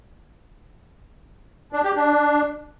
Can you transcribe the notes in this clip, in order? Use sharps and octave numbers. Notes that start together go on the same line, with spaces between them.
D4
G4
D4